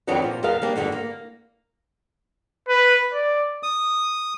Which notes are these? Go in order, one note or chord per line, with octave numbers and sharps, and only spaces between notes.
F2 D#3 E3 F#3 B3 D4
A#2 F3
E2 B3 A#4 F5
G3 A#3 D4
E2 G2 D3 E3
A#3
B4
D5
D#6